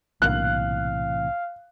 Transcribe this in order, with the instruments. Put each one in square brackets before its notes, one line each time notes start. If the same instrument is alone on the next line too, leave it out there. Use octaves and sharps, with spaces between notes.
[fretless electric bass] B1 A#3 D4 [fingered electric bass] A2 C3 E3 [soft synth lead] F5 [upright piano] F#6